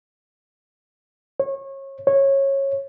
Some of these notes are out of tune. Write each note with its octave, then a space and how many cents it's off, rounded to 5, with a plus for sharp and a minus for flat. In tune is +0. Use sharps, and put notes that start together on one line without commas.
C#5 -30
C#5 -20